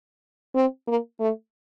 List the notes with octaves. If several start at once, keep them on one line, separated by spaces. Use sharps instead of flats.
C4
A#3
A3